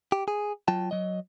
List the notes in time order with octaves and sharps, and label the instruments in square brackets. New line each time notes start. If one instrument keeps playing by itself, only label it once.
[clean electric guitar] G4
G#4
F#3 F4 G5 A5
F#3 D#5